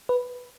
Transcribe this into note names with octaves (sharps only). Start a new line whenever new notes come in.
B4